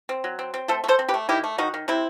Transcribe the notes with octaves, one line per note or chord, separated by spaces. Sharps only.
C4
F#3
C4
C4
A3 A4 C5
A3
A4 C5
C4
G4 B4
A3
D#3 E4 G4
A3
D#3 D#4 F#4
D#3
C3 C4 E4